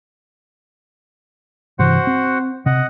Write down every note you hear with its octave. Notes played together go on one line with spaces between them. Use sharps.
G2 C3 E3 F#4 C5 F#5
C4
C3 D#5 F#5